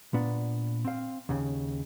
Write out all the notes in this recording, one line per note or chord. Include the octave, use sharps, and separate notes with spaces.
A#2 B3 D4
C4 F5
D#2 C#3